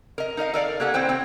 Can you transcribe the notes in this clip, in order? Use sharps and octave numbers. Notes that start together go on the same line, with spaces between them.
A#4 D#5
D#4 A#4 D#5 F5
A4 A#4 D5 F5
A#3 G4 A4 F#5 G#5
C4 E4 C5 G5
C4 G5